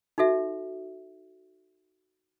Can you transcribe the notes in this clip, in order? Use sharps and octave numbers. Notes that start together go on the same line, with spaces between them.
D#4 F#4 A4 E5